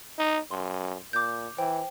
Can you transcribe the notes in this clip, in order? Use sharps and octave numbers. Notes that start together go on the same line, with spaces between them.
D#4
F#2 C6
A#2 D6 G6
E3 C5 G5